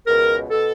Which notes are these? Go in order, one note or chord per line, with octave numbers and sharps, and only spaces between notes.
C#2 B2 A#4
B2 A4